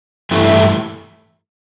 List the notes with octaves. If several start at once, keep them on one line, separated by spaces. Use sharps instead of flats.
G2 E3 A3 E4